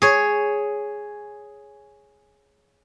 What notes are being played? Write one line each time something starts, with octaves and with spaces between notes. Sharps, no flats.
G#4 C#5